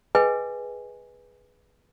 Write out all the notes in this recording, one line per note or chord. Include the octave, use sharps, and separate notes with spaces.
G#4 B4 D#5 G5 G#5